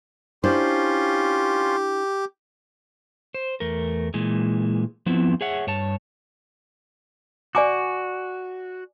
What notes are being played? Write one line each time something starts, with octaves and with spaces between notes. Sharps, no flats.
C#4 D4 E4 F4 G4 C5 C6
C5
E2 A3 A#4
A#2 E3 G#3
F3 B3 C4 E4
G#4 C#5 E5 F#5
G2 C#5 A5
F#4 D5 G#5 D6